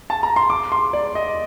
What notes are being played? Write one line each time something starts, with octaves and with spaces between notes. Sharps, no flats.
A5
A#5
C6
D6
C6
D5
D#5